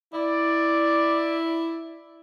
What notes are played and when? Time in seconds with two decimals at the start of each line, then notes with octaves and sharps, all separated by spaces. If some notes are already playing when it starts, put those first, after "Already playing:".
0.13 E4 D5